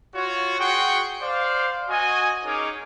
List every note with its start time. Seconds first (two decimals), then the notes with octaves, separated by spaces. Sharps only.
0.14 F4 F#4 C#5
0.59 F#4 G#4 F#5 G5 C6 C#6
1.22 C5 D5 F5
1.89 F#4 D#5 G#5
2.45 C#4 D#4 G#4 A#4 C#5 D6